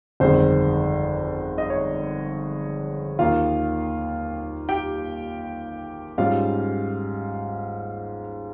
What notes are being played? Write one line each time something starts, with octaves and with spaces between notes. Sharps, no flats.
G1 F2 D#3 G#3 C5
D#5
C#5
D#2 D#3 A#3 F4 F5
G4 G5
G#2 G3 C#4 F4 F5